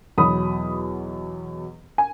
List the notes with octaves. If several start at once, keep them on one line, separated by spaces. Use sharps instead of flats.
E2 B2 F#3 B5 D#6
G#5